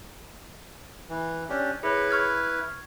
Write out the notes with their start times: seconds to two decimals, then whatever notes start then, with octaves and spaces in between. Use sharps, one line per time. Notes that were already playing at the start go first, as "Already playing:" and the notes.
1.09 E3
1.50 C#4 D4 G4
1.83 E4 G#4 B4 C#5
2.11 C#6 F6 G#6